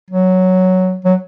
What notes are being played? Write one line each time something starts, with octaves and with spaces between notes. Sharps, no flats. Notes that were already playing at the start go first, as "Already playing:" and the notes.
F#3
F#3